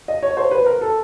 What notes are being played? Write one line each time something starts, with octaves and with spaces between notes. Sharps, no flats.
D#5
C#5
C5
B4
A#4
A4